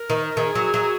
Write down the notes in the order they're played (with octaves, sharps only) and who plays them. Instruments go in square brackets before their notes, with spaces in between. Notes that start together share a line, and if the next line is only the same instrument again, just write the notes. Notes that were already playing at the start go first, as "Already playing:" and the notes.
Already playing: [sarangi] A#4
[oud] D#3
[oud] D#3 [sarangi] G#4
[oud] F#3
F#3